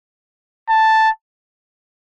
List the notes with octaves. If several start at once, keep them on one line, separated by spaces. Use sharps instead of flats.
A5